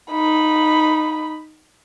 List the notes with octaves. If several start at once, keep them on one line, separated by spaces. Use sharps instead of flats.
D#4 B5